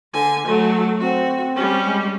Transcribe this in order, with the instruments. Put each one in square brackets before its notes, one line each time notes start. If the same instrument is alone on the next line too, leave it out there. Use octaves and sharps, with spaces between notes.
[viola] D3 G#5
[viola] F#3 A3 [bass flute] A4
[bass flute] C4 [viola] F#4
[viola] G3 C#4
[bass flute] G#3